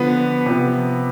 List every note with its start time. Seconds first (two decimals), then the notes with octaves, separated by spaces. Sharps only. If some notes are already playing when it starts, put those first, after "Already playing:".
Already playing: D3 F3 B3 B4
0.46 C3 F3 B3